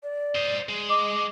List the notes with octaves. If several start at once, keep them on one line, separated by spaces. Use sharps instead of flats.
D5
C5 D#5
G#3
D#5 D6